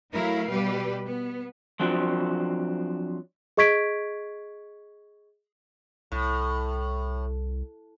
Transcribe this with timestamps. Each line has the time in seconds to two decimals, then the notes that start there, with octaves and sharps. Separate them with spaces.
0.13 F#3 A3 E4 A#4 F5
0.50 B2 G3 G4 B4
1.05 B3
1.80 F3 F#3 C4 D4
3.57 G#4 D#5 C#6 G#6 B6 D7
6.12 C2 A2